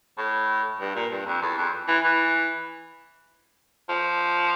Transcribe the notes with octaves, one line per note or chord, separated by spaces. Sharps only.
A2
G2
A#2
G2
F2
E2
F2
E3
E3
F3